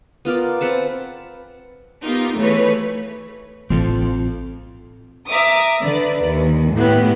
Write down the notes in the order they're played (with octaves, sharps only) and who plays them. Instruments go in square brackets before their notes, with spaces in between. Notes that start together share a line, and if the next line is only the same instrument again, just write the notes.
[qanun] B3 F4 A#4 D5
C4 B4 F#5 A5
[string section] B3 D#4 F4 G4 A#4
E3 A3 G#4 B4 C#5
[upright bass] A1 [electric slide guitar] C4 F4 A4
[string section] E5 A#5 D6 D#6
D3 B4 D5
D#2
A2 B3 E4 G4